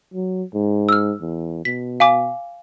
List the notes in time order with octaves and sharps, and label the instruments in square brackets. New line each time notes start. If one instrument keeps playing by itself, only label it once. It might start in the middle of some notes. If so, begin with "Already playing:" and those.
[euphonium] F#3
G#2
[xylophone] E6 F6
[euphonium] E2
[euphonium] B2 [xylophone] B6
[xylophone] F5 G#5 D6